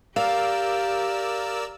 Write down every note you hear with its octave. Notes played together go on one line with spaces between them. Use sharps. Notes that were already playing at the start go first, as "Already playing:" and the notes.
G4 A#4 D5 F5 E6